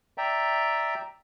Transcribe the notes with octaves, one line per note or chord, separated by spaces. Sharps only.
D5 E5 G5 A#5